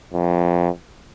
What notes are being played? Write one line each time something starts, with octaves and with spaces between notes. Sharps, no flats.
F2